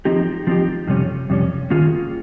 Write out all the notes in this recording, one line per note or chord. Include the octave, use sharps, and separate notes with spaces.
F3 C4 D#4 G4
F3 C4 D#4 G4
F2 C3 G3 C#4
F2 C3 G3 C#4
D#3 A#3 C#4 F4 G#4